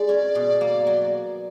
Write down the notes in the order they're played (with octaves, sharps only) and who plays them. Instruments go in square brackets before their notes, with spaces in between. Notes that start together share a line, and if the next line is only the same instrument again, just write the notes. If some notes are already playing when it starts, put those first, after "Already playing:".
Already playing: [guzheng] G#3 [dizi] D5
[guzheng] C#4
B2
A#3
F#3